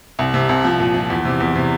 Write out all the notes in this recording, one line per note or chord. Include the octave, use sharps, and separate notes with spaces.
C2
C3
C2
F3
A#2
F3
E2
C3
E2
C3